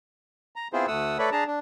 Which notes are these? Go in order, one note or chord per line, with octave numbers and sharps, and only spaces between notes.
A#5
B3 C4 E4 F4 G#4 C5
D2 A3 F#5 D#6 E6
A3 A4 B4 C#5 D5 B5
D4 G#4 A5 A#5
D4